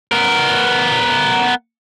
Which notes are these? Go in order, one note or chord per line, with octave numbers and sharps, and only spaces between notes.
B3 A#4